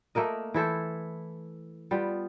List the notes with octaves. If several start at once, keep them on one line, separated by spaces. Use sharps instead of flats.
A3 A#3 A#4 D#5
E3 E4 A4 C5
G3 B3 F4